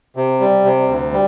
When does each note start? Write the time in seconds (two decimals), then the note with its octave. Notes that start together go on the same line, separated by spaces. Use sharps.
0.16 C3
0.40 G3
0.65 C3
0.88 D2
1.12 G3